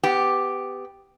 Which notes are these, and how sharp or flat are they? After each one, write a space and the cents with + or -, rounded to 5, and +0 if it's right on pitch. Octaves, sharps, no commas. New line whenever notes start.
B3 +20 G4 +0